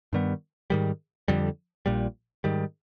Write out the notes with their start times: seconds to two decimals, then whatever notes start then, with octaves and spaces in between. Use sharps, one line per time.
0.13 G2 D#3 G3 B3
0.70 G#2 D#3 G3
1.28 F2 D3 G3
1.86 A#1 A#2 G3
2.44 G#2 D#3 G3